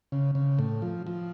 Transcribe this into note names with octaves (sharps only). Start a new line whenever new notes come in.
C#3
C#3
A2
F3
F3